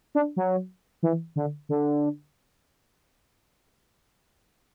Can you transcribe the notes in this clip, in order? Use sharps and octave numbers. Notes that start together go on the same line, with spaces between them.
D4
F#3
E3
D3
D3